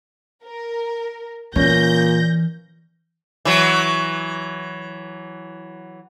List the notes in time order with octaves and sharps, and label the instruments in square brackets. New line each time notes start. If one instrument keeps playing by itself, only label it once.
[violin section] A#4
[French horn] A#2 [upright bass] E3 [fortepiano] C#4 [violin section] G6 A#6
[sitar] E3 F#3